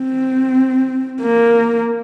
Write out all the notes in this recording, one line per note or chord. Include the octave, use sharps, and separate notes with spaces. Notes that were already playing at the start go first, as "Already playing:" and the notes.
Already playing: C4
A#3